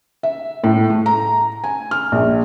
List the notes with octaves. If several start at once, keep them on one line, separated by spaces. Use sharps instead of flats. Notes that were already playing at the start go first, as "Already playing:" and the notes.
E5
A2
A3
A#5
G#5
F6
A#1